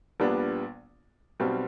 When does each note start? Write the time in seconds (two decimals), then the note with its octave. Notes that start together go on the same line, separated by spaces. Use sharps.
0.20 A#1 A#2 G3 B3 D4
1.40 B1 B2 G3 C4